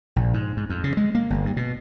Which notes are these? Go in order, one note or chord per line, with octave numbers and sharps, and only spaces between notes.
A#1
G#2
G#2
F2
C#3
G#3
A#3
G1
G2
B2